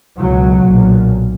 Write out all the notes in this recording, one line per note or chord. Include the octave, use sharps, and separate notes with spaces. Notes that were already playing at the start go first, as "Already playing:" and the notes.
C#2 B2 F#3
B1 A#2